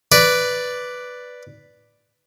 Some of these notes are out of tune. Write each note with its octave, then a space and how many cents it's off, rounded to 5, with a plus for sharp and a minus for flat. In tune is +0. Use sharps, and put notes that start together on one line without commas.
B4 +0 D5 +0